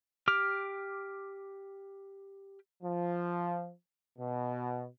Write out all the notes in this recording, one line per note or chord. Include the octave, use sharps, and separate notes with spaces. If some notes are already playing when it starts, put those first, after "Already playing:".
G4 D6 F6
F3
B2